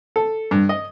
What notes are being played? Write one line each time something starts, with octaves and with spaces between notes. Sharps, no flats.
A4
G2
D#5